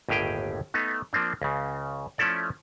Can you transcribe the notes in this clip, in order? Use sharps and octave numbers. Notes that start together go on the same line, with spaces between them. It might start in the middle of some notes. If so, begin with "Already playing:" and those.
G1 D#2 A2 G4 G#4 G5
A3 B3 D#4
F3 A#3 C4 D4
C#2 C#3
F3 A3 C#4 E4 A4 D5